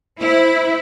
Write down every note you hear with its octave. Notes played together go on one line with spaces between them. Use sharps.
E4 C5